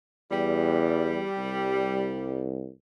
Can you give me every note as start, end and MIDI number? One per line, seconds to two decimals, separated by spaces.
0.31 1.24 40
0.31 2.44 55
1.37 2.70 36